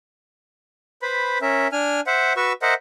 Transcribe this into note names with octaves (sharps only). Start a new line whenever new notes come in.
B4 C5 B5
C#4 A#4 E5
D4 G#5 F6
C5 E5 F#5
F#4 B4 C#6 E6
A#4 C5 D#5 E5 F#5